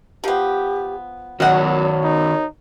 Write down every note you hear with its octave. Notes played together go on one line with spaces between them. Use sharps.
F3 B3 G4
D#3 F#3 C#4 F#4 A#4 C#5 D#5 F#5
D#4